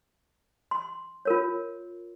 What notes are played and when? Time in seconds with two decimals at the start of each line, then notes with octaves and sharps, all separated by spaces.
0.71 C6
1.25 F4 A#4 C#5